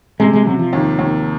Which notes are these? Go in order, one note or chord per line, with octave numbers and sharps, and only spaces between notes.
C3 G#3
G#3
C3 F#3
F3
D#2
D#2